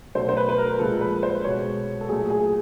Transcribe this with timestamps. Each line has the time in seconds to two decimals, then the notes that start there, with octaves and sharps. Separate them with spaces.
0.15 B2 F#3 A3 C5
0.29 C5
0.37 B4
0.49 B4
0.58 A#4
0.79 A#2 F3 G#3 A4
1.01 B4
1.23 C5
1.44 B2 G#3 C#5
2.01 A4
2.09 A#2 F#3 A3 G#4
2.30 G#4